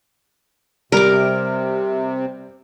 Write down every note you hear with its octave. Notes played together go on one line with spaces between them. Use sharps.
C3 G3 A#4 D6